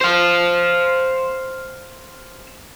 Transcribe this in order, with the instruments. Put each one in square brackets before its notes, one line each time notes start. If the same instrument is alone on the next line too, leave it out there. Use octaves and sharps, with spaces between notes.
[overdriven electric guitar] C5 F5